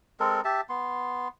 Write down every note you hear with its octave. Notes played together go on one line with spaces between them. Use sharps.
G#3 C4 A4 A#4
G4 E5 A5
B3 C6